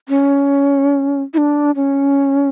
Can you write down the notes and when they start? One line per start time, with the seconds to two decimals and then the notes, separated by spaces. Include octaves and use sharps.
0.09 C#4
1.34 E4
1.38 D4
1.76 C#4